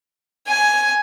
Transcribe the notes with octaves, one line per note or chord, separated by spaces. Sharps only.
G#5